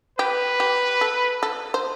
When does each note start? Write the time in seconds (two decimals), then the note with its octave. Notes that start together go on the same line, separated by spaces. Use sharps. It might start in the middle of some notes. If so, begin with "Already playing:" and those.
0.19 G4 B4
0.60 G4
1.01 A4
1.43 A4
1.74 C5